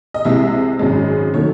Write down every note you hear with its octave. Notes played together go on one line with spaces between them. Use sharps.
D#5
C2 C3 E3 G#3 E5
G#1 F#2 C#3 G#3
D#3 F#3 A3 C#5